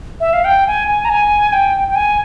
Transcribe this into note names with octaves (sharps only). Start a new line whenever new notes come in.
E5
F5
G5
G#5
G#5
A#5
G#5
G5
G5
G#5